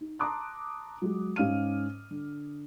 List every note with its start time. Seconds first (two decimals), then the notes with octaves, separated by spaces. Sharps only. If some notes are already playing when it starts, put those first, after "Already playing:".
0.01 D#4
0.19 A5 A#5 C6 D6 D#6 F#6
1.02 F#3 G#3
1.36 G#2 C#4 F5 F6 D#7
2.11 D3